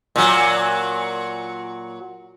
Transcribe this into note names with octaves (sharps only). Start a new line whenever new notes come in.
A#2 F#3